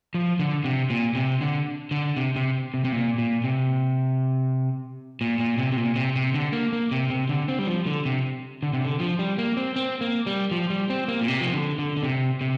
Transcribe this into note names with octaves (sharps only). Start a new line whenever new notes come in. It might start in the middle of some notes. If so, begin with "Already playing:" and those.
F3
D3
C3
A#2
C3
D3
D3
C3
C3
C3
C3
A#2
A#2
C3
A#2
A#2
C3
C3
A#2
C3
C3
D3
A#3
A#3
C3
C3
D3
C4
G3
F3
D3
C3
D3
C3
D3
F3
G3
A#3
C4
C4
A#3
G3
F3
G3
C4
A#3
A#2
C3
F3
D3
D3
D3
C3
C3